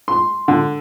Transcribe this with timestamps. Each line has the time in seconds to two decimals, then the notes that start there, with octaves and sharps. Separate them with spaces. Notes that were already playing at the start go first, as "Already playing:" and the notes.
0.08 C6
0.48 D3